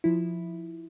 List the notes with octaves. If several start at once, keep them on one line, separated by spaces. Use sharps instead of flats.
F3 E4